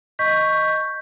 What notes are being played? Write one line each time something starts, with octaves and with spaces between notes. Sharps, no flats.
D#5 C#6 G6 B6